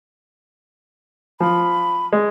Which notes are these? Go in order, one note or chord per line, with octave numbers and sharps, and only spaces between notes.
F3 B5
G#3